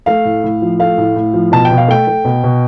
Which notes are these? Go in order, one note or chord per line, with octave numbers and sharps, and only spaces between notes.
A3 F5
A2
A2
F3
A3 F5
A2
A2
F3
B2 A5
G5
B2
F5
A3 G5
A3
B2
B2